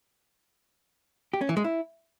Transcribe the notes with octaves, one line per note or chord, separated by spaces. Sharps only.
G4
C#4
E3
G#3
E4